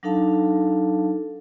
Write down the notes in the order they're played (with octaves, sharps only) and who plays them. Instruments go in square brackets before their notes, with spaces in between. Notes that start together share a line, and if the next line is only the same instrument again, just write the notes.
[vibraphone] F#3 D4 D#4 A4 F5 A5